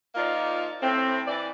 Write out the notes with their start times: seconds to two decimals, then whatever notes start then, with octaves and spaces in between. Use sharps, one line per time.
0.15 F3 A#3 D#4 F4 D5
0.80 A2 C4
1.26 E3 D5